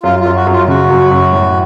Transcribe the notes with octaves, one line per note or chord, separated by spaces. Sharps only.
F#2 F4
F4
F#2
F#4
F#2
F4
C#3 F#4
F#2
F#2
A1